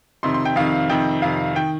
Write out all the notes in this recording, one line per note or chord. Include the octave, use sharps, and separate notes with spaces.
F2 C3 D#3 C6
C6
G5
F2 C3 D#3 F5
F2 C3 D#3 G5
F2 C3 D#3 F5
D#3 G5